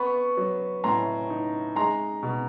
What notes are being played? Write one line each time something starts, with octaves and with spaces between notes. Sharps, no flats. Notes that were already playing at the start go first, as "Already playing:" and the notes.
Already playing: B3 B5 C#6
F#3
A2 A#5 C6
D#4
G#3 A#5 C6
B2